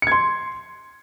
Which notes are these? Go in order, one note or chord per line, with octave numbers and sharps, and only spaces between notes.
C6 G#6 C#7